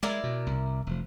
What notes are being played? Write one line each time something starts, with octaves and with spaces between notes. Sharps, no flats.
G#3 E4 A#4 D5
B2
C2
F1 F3